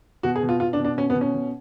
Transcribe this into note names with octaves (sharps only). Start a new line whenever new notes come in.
B2 F#4
G#4
B2
F4
B2 F4
D4
B2
D4
B2 C#4
B3
B2
C#4
B2